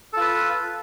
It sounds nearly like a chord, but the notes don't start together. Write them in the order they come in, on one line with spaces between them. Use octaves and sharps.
A4 F4 B4